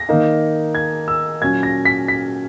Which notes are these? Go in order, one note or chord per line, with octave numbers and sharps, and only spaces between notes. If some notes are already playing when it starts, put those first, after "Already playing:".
Already playing: A#6
D#3 A#3 D#4
G#6
E6
A#2 F#3 C#4 G#6
A#6
B6
B6